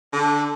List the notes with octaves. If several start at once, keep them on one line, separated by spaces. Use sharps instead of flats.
D3